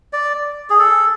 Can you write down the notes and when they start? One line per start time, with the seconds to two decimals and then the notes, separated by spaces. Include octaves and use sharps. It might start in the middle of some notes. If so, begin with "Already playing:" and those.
0.13 D5
0.70 G#4
0.79 A4